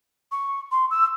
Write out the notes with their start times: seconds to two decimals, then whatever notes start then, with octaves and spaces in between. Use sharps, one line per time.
0.32 C#6
0.71 C6
0.90 E6